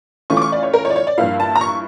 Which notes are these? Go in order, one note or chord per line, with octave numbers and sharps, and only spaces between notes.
E3 A3 C#4 F4 C#6
D6
C#6
D5
C#5
A#4
C#5
D5
C#5
D5
G2 F3 A#3 E4 F5
A5
A#5
C#6